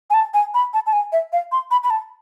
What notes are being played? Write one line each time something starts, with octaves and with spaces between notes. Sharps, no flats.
G#5
A5
G#5
B5
A5
A5
G#5
E5
F5
C6
B5
B5
A5